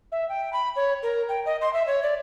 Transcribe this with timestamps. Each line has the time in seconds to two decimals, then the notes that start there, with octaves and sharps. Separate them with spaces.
0.12 E5
0.29 G5
0.53 B5
0.76 C#5
1.03 A#4
1.29 G5
1.46 D#5
1.61 C6
1.73 E5
1.87 C#5
2.03 D5